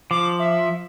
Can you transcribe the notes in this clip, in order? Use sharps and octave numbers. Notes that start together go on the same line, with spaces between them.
F3 D6
E5